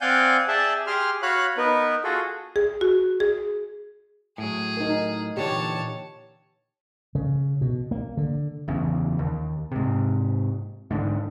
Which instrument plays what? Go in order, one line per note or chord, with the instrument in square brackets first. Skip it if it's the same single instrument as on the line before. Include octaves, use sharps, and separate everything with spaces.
[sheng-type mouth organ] C4 D5 F5 F#5 G#5 G6
G#4 D5 E5 G5 A5
G4 G#4 C6 F6
F#4 C#5 F5 B5 F#6
B3 D#4 A#4 B4
F4 F#4 G#4 A4
[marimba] G#4
F#4
G#4
[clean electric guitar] A2 F#3 [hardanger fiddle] G#4
[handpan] D#4 A#4
[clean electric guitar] A#2 D3 E3 [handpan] G4 [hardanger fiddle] C#5 A5
[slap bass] C#3
B2
A#3
D3
[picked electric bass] F#1 E2 C#3
D#2
G#2 C3
G#2 D3